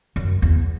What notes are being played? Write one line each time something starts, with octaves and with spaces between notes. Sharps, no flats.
F#2
E2